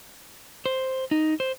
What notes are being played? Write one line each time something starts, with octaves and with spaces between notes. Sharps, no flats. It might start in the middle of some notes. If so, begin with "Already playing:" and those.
C5
D#4
C5